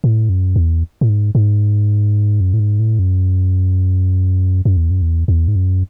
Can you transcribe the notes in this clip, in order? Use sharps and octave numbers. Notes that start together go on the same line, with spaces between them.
A2
F#2
E2
A2
G#2
G#2
F#2
A2
G#2
A2
F#2
F#2
E2
F#2
E2
E2
G#2
F#2